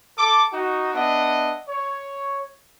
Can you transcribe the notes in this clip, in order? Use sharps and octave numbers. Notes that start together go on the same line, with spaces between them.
A4 D6
D#4 F#4
B3 D4 D#5 E5 F#5
C#5